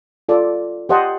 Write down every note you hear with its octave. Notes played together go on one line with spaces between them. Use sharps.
F4 A4 D5
G4 C5 D#5 F#5 A5